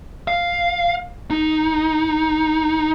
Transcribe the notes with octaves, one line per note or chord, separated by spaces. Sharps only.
F5
D#4